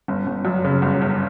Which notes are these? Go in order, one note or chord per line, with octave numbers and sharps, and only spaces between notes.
G1
G1
F#2
C#3
G1
G1